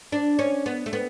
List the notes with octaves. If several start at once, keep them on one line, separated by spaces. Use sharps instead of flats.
D4
C#4
B3
A3
B3